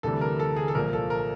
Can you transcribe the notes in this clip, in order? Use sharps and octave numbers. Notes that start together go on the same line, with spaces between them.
D2 C3 E3 G3 A4
A#4
A4
G#4
A4
C2 A#2 F3 A#4
A4
A#4